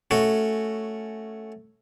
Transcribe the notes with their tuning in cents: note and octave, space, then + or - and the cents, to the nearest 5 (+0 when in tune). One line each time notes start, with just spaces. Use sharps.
A3 +0 C#4 +0 F#4 +0